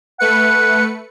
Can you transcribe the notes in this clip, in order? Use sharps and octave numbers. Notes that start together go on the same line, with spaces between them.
A3 B4 F#5 C#7